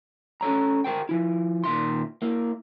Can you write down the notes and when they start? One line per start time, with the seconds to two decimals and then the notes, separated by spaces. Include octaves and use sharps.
0.41 C#4 A4 C#5 A#5
0.84 G#4 A#4 C5 G5
1.09 F3 E4
1.64 A#2 D#3 E5 C6
2.22 A#3 E4